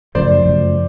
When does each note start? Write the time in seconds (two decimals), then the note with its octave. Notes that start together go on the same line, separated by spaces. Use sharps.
0.15 F#2 C#3 F3 A3 C5 D5
0.45 F#2 C#3 F3 A3